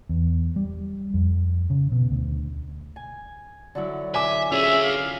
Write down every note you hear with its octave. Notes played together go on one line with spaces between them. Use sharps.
E2
G3
F2
C#3
B2
D2
G#5
D3 F#3 E4
E5 G#5 D6
C#4 F4 G#4 E5 F6
F5